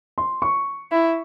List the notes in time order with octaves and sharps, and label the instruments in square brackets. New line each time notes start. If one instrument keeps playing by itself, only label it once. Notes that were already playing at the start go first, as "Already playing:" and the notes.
[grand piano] C6
C#6
[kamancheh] E4